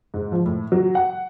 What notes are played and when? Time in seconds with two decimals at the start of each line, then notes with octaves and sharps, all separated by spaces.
0.14 G#2
0.32 F3
0.46 A2
0.72 F#3
0.95 F#5